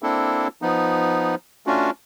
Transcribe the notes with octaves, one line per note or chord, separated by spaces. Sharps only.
A#3 C4 D4 E4 A4
F3 B3 D#4
A3 C#4 D4 F4 F#4